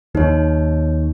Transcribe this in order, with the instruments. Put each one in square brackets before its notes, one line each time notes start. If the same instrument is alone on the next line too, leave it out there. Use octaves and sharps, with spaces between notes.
[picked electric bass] D#2 [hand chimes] D#4 C#5